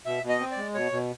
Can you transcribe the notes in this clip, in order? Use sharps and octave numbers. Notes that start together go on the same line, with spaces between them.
B2 E5
B2
D#5
C4
D5
G#3
B2 C#5
B2